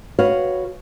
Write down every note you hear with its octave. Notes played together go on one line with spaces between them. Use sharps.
F#4 B4 C#5 F5